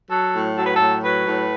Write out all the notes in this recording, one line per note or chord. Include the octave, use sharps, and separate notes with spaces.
F#3 A4
A2
F#3 A4
B4
A2 A4
F#3 B4
A2